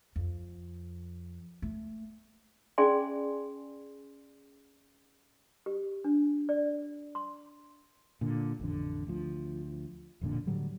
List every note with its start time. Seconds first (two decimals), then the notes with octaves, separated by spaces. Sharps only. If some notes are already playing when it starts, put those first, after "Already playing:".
0.16 F2
1.62 A3
2.78 C#4 G#4 D5 G#5 C6
5.66 G4
6.04 D4
6.49 D5
7.15 C6
8.21 A#2 D3
8.59 A1 F2 D3
9.07 D2 F3
10.21 E1 F2 A#2 D3
10.47 A2 D3 F#3 G3